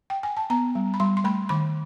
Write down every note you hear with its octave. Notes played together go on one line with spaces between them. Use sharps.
G5
G#5
A5
B3 A#5
G3
B5
G3 C6
C6
A3 B5
D#3 B5